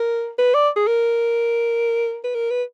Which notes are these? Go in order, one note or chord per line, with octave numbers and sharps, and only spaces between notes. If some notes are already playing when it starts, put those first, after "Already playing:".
Already playing: A#4
B4
D5
G#4
A#4
B4
A#4
B4